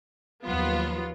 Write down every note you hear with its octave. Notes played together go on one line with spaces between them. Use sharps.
D#2 F3 F#3 B3 F4